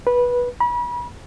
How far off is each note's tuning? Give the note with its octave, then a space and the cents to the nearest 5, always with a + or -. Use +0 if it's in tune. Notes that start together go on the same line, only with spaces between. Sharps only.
B4 -15
B5 -35